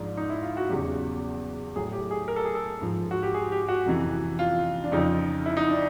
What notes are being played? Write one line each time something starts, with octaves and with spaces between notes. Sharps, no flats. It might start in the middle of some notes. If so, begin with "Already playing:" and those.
Already playing: G#2 F3 D4
D#4
E4
F4
F#4
E2 C#3 F#3 G4
A2 F#3 G#4
G4
G#4
A#4
A4
G#4
A4
G#2 F3
F#4
G4
G#4
G4
F#4
F2 C3 E3
F4
D4
F2 C#3 F3 D#4
E4
D#4
D4